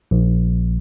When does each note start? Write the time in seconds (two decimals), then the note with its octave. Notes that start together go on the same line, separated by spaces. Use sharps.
0.11 A#1